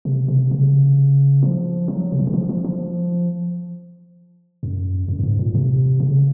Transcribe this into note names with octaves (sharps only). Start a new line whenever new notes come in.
C3
C3
C#3
F3
F#3
C3
C#3
D#3
F3
F3
F3
F#2
F#2
F#2
G#2
A#2
C3
C#3